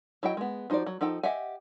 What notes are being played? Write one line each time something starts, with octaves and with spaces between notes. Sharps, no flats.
F#3 E4 D#5 G5
G#3 B3
F3 D#4 F#4 C5 D5
F#3
F3 D#4 A4 G5
G4 D#5 E5 F#5 G#5